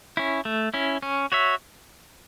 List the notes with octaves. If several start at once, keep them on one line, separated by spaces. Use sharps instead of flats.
C#4 E4
A3
C#4 E4
C#4
F#4 C#5 E5